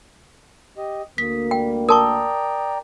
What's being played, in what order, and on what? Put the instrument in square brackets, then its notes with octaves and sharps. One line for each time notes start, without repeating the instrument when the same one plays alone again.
[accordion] G4 D#5
[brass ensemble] D2 A#3 [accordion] D#6 [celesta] B6
[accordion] G3 [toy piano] G5
[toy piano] A#4 A5 C#6 [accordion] D5 G5 A#5 [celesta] D#6